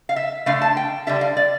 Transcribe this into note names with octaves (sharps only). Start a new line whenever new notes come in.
F5
E5
D3 A3 D4 F5
A5
G5
D3 G3 D4 E5
F5
D5